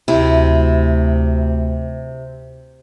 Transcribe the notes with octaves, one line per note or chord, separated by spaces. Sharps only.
D2 C3 E4